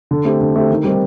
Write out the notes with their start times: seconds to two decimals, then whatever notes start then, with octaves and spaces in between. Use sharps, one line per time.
0.11 D3
0.25 A3 C4 G4
0.41 D3
0.56 A3 C4 G4
0.70 D#3
0.84 G3 C4 D#4 A#4